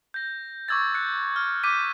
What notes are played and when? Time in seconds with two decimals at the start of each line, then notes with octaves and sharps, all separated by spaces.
0.14 G6 A#6
0.68 C#6 D6 E6 G#6 A6
0.94 F#6 G6 C#7
1.36 F6
1.64 D6 G6 B6 D#7